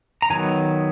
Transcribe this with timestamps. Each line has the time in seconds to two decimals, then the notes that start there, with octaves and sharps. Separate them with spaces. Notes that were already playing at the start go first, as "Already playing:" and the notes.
0.22 A#5
0.30 D#3 F#3 B3 G#5